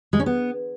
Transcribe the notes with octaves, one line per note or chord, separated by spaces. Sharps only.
G#3
C#4
B3